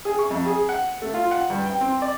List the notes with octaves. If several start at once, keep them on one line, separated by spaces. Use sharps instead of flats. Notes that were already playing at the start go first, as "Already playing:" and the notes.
G#4
C#6
F2
G#4
F#5
A3
F4
F#5
G2
G5
C4
D5